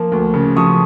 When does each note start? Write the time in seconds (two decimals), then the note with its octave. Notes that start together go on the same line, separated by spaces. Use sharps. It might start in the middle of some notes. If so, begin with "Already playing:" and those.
Already playing: F3 A#3
0.12 D2
0.34 C#3
0.56 F3 C#6 D#6